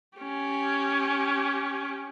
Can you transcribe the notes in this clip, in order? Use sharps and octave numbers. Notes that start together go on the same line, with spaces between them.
C#4 G4